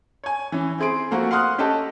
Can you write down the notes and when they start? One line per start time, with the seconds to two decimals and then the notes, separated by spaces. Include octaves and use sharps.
0.24 C#5 G#5
0.52 E3 C#4
0.78 C4 E4 G#4 C6 D7
1.11 F3 A3 A#3 F#4
1.31 F5 F#5 C6 D#6 F6 F#6
1.58 C#4 G4 A4 D#5 A5